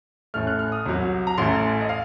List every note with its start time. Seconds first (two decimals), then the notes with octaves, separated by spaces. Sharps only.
0.34 A1 A2 A3 F6
0.47 F#6
0.59 F6
0.72 D#6
0.86 C2 C3 F#3
1.27 A#5
1.38 A1 A2 A3 C6
1.81 D#5
1.89 F5